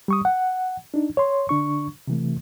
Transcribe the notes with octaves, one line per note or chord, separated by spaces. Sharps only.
G3 C#6 D#6
F#5
D4 D#4
C#5 C6
D3 D4 C#6
C3 E3 A3